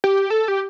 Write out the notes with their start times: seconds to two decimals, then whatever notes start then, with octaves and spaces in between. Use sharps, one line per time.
0.04 G4
0.30 A4
0.48 G4